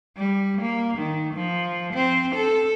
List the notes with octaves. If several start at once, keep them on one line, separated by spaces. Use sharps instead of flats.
G3
A#3
D#3
F3
C4
A4